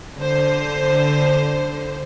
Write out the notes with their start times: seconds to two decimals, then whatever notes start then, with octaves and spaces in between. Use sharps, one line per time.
0.17 D3 C5